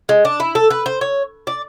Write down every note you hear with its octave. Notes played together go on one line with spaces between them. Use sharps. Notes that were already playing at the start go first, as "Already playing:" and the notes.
G#3
D4
E4
A4
B4
C5
C#5
D5